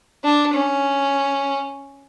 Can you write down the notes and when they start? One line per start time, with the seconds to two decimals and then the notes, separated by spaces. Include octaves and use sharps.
0.24 D4
0.53 C#4